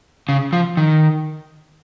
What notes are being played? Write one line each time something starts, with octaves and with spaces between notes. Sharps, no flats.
C#3
F3
D#3